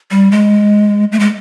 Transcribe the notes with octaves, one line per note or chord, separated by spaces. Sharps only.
G3
G#3
A3
G#3